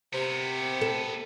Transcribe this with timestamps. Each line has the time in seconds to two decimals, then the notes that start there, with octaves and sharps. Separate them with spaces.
0.13 C3 B3 A#4
0.81 A4